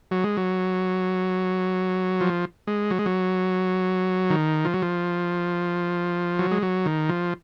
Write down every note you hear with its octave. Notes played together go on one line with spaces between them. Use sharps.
F#3
G#3
F#3
F3
G#3
F#3
G#3
F#3
D#3
F3
F#3
F3
F#3
G#3
F#3
D#3
F3